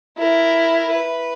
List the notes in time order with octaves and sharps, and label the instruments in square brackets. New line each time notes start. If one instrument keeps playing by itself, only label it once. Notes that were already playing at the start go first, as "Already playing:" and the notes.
[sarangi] E4 [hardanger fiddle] A#4
[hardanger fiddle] B4